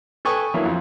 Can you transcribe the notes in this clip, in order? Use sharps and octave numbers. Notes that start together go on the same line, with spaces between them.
A4 B4 G5 G#5 C#6 D#6
E3 F#3 A#3 D4 E4
F2